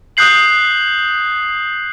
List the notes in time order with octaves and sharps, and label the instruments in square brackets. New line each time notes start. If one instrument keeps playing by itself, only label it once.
[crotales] D#6 F#6 G6 C7 F#7